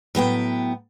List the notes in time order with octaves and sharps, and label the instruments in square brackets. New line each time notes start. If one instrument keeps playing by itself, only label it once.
[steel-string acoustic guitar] A2 F#3 B3 G5